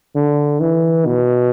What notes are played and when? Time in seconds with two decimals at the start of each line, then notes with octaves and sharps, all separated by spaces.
0.15 D3
0.60 E3
1.06 B2